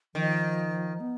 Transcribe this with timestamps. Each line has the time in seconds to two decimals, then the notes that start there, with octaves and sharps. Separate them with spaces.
0.15 D#3 F3
1.00 B3